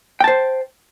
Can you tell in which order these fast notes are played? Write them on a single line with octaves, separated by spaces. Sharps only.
G5 A5 C5